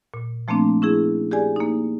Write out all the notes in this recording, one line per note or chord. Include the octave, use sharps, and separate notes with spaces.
A#2
F3 A3 A#3 C4 D4
C#4 E4 G#4
G4 G#4 D5 G#5
A#3 D#4